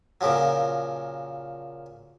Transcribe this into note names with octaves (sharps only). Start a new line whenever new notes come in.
A#2 C#3 F3 F#3